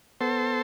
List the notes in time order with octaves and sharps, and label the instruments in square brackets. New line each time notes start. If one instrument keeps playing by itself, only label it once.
[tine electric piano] B3 [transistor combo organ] A4 C5